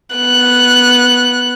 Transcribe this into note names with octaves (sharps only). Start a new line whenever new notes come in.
B3 F#6